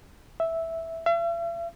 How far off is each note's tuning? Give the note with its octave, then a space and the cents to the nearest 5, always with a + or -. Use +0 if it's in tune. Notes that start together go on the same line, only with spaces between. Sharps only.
E5 -5
E5 +45